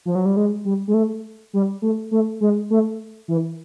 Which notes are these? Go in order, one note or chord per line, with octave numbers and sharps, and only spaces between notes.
F3
F#3
G3
G#3
G3
G#3
A3
G3
A3
A3
G#3
A3
E3